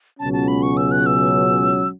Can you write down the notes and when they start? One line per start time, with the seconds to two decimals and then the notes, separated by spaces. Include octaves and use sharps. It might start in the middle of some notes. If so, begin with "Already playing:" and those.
0.19 C#2 B2 F#3 C#4 A5
0.33 A5
0.48 B5
0.63 C#6
0.77 E6
0.92 F#6
1.06 E6